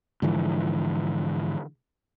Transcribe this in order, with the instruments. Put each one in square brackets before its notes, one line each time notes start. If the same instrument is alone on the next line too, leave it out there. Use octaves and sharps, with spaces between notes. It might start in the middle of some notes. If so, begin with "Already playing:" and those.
[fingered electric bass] G#2 D3 E3 F3